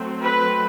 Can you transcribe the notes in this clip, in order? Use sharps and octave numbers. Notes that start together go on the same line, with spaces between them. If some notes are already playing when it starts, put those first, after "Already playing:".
Already playing: F#3 A3 C4
B4